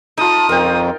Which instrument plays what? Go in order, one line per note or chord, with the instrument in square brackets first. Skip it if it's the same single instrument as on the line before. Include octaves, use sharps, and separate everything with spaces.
[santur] D#4 F4 [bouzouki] A4 [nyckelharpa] D#6
[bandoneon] F2 [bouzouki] C4 C#4 [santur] A#4 F5 G5